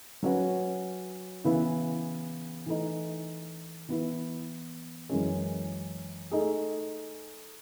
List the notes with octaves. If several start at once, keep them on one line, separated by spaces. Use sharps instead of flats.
F#3 C#4 F#4 B4
C#3 E3 B3 E4 B4
E3 A3 D#4
E3 B3 E4
F#2 E3 G#3 C#4
A3 D#4 G#4